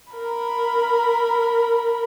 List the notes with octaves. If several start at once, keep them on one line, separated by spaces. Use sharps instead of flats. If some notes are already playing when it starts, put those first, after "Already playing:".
A#4 B5